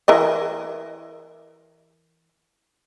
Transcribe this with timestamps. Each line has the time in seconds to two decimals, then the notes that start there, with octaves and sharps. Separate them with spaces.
0.08 E3 A#4 D#5